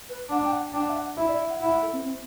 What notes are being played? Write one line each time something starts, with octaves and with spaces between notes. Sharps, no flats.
B4
D4 F#5
G5
F#5
D4 G5
F#5
E5
F#5
E4 E5
D5
E5
F#5
E4 F#5
F#5
A4
C4
C4